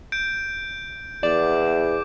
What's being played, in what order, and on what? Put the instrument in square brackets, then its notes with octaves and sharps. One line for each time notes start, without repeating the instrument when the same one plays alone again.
[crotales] G6 D7
[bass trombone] E2 [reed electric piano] D5 [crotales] D6